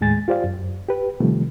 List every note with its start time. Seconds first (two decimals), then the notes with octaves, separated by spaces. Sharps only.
0.01 D#2 A2 G#3 G#5 A6
0.28 F4 G4 C5 D5 F5
0.44 F#2
0.88 G4 B4
1.20 C3 D#3 F3 G3 A3